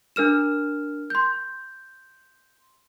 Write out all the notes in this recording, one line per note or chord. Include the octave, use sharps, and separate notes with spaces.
D4 A#4 F6 E7
C6 G6